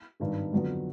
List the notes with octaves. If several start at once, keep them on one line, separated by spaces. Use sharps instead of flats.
G#1 G2 D#3
F2 D3 F#3 B3